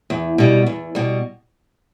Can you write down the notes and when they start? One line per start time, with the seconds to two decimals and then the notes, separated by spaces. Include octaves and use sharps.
0.10 E2
0.38 B2 G3
0.66 E2
0.95 B2 G3